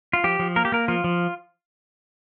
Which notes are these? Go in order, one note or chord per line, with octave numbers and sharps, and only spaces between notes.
F4
F3 G4
F3
A#3 A#4
G4
A#3 A#4
F3 F4
F3